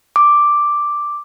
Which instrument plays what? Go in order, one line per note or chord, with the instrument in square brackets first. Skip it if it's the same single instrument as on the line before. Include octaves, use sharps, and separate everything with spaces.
[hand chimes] D6